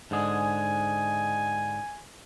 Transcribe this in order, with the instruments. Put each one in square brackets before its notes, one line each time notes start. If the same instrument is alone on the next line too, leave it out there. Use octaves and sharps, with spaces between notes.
[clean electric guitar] G#2 D3 G#4 [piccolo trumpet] G#5